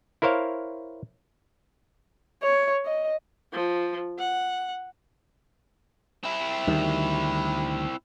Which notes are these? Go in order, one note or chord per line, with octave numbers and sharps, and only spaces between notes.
E4 A#4 C5 C#5 F5
C#5
D#5
F3
F#5
C4 E4
D2 D#3 G3